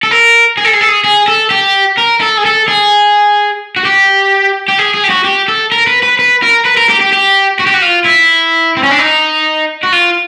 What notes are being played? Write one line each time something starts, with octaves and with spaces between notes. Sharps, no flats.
A4
A#4
G#4
A4
G#4
A4
G#4
G#4
A4
G4
A#4
A4
G#4
A4
G#4
F#4
G4
G4
G#4
G#4
G4
F#4
G4
A4
A#4
B4
B4
B4
A#4
B4
A#4
G4
G4
G4
F#4
G4
F#4
F4
E4
C4
C#4
D4
D#4
F#4
F4